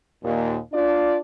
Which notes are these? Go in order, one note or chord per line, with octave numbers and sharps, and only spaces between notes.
D#2 A#2
D4 F4 D5